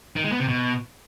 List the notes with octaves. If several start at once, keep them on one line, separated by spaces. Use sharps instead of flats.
D#3
G#3
B3
C3
B2